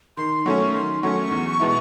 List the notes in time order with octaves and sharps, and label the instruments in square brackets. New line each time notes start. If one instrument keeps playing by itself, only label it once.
[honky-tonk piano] D#3 [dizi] C6
[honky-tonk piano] F#3 A3 C#4 [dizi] C#6
[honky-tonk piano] D#3 [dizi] C6
[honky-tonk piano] F#3 A3 C#4 [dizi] C#6
[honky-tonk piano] E2
B2 G#3 B3 E4